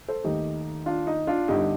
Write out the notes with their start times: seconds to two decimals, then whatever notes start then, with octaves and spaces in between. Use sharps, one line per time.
0.08 A4 C5
0.24 D#2 D#3 A3 D#4 G4
0.86 D4 F4
1.07 D#4
1.27 D4 F4
1.48 G1 G2 D3 D#4 G4